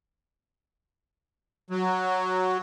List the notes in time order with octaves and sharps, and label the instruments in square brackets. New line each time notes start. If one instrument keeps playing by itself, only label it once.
[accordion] F#3